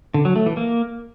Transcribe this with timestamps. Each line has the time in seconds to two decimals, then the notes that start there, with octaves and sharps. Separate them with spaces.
0.14 D3
0.25 F#3
0.36 A3
0.46 E3
0.57 A#3